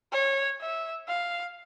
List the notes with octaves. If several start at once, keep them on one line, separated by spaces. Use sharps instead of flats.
C#5
E5
F5